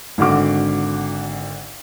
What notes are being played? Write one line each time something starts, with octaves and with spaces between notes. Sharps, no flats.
G#1 D3 F#4 D6